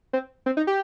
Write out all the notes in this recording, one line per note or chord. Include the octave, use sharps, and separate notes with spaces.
C4
C4
D#4
G4